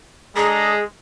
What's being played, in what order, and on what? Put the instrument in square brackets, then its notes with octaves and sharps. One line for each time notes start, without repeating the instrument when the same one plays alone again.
[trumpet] G#3 [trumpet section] D4 A4 A#5 [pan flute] G#4